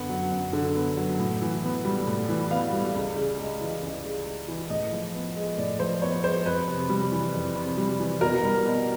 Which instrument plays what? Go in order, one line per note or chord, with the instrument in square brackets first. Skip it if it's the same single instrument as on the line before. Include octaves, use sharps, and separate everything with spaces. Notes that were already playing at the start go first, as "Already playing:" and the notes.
Already playing: [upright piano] F#2 D3 B3 F#5
F#3
F#2
D3
B3
F#3
A2
E3
B3
G3
A2
E3
B3 F5
G3
C#2
C#3
G#3
E3
C#2
C#3
G#3
E3
A2 D#5
F3
B3
G#3
A2 D5
F3 C5
B3 C#5
G#3 C5
F2 B4
C3
G3
E3
F2
C3
G3
E3
B2 A#4
G3
B2